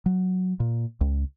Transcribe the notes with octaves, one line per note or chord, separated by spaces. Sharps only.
F#3
A#2
C#2